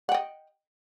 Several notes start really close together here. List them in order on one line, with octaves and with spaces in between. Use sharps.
F#5 G5 D#5